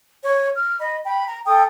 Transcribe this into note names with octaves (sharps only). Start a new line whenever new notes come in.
C#5 C#6
F6
D#5 B5
G5 B5
A#5
A4 G5 D#6